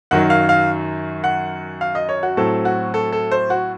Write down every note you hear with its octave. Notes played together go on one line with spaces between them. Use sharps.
F#2 D#3 F#3 F#5
F5
F5
F#5
F5
D#5
C#5
F#4
A2 F#3 C4 A4
F#4
A4
A4
C5
F#4